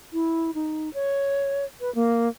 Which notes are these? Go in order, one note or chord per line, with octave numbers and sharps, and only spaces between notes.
E4
D#4
C#5
B4
A#3